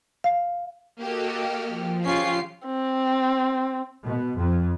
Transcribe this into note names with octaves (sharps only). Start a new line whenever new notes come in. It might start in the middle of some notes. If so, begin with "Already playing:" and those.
F5
A#3 F#4 G4 A4 D#5
F6
F3
C#3 C#4 F4 G4 C7
C4
B2
F2